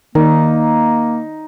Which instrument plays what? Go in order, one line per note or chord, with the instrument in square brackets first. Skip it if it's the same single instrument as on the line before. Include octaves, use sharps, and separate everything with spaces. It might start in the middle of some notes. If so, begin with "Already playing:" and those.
[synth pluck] D#3 [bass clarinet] A#3 [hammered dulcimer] D#4